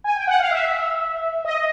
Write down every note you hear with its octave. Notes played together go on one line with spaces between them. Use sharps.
G#5
G5
F#5
F5
E5
D#5